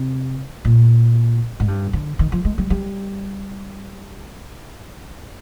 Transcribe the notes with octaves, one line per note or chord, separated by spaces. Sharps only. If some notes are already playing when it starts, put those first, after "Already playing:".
Already playing: C3
A#2
G#2
G2
D3
D#3
F3
G#3
G3
G3